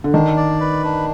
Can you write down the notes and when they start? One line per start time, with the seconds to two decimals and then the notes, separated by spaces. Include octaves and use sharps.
0.04 D3
0.13 D#3 D4
0.37 D5
0.60 B4
0.84 D4